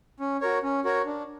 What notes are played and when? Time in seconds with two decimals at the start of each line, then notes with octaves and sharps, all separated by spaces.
0.20 C#4
0.41 F#4 A#4 C#5
0.63 C#4
0.85 F#4 A#4 C#5
1.06 D4